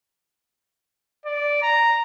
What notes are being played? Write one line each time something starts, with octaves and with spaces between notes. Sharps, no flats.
D5
A#5